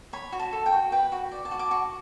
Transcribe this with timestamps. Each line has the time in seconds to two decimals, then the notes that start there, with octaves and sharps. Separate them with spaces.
0.13 C#5 B5
0.32 F#4
0.39 A5
0.53 A4
0.66 G5
0.72 F#4
0.92 B4 G5
1.12 F#4
1.32 D5
1.45 A5
1.51 F#4
1.59 D6
1.71 F#4 C#6